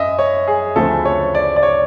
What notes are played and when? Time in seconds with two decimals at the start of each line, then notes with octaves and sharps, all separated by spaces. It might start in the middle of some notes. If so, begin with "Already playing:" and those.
Already playing: F#2 D#5 E5
0.19 C#5
0.47 G#4
0.76 D2 C#3 F3 A3 C4 A4
1.05 C#5
1.35 D5
1.56 D5
1.63 C#5